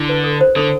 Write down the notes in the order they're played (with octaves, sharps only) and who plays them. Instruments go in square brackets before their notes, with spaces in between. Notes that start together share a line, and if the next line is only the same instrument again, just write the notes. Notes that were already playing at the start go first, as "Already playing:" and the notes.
Already playing: [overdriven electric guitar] D3 [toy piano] E4
[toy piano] B4
A4
C5
[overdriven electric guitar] D3 [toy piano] A4